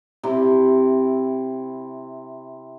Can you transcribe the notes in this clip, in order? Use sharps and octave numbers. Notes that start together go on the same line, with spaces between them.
C3 E4